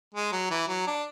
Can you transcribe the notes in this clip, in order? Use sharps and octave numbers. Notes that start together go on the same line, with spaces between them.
G#3
F#3
E3
F#3
D4